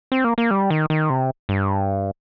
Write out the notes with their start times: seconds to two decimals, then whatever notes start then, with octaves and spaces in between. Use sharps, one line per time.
0.12 C4
0.24 A#3
0.38 A#3
0.51 G3
0.70 D#3
0.90 D#3
1.10 C3
1.49 G2